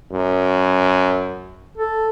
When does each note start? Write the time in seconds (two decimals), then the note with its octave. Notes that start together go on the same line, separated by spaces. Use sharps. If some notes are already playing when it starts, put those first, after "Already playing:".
0.11 F#2
1.77 A4